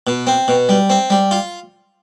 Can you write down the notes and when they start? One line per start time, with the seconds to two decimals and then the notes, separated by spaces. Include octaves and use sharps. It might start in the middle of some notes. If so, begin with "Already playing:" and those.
0.07 B2
0.27 C4
0.48 B2
0.69 G3
0.90 C4
1.10 G3
1.31 F4